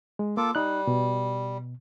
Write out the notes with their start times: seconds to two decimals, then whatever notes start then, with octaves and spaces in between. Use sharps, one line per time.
0.19 G#3
0.37 A#3 F4 A4 D6
0.55 G3 D#4 F#6
0.87 B2